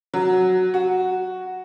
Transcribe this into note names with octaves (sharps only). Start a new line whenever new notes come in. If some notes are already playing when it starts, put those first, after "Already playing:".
F#3
F#4